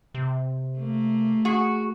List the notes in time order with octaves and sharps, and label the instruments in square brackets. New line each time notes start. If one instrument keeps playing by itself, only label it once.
[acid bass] C3
[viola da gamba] A3 A#3
[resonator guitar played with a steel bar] F#4 [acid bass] G#4